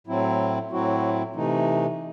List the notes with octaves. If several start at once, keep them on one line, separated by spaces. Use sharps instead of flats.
A2 F#3 C4 E4
A2 F#3 C4 E4 F#4
C3 E3 A3 D#4